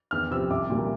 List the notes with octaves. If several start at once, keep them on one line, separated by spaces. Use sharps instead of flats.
E2 F6
C3 F3 C4 E6
C2 D6
A#2 G3 A#3